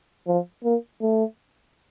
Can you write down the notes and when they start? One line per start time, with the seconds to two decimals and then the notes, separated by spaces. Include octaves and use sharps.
0.27 F3
0.64 A#3
1.02 A3